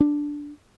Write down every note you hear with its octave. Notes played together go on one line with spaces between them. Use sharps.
D4